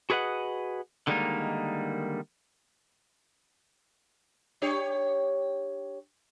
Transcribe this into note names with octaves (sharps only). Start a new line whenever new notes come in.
F#4 G#4 B4 D#5 F#5
D3 D#3 G3 G#3 A#3 D#4
D4 G4 C#5